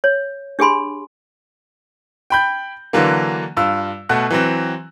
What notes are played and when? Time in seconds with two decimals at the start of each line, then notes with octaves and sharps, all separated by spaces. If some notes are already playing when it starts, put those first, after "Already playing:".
0.04 C#5
0.59 D4 G4 G#4 G#5 B5 C6
2.30 G5 B5 G6
2.93 D3 E3 F#3 A#3
3.57 G2 F4 E6
4.09 B2 A3 F#5 F#6
4.31 E3 F#3 C4